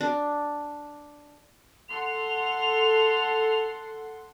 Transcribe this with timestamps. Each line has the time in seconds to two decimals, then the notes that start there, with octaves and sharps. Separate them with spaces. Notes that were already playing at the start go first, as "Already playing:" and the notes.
0.01 D4
1.89 A4 F#5 C6 F7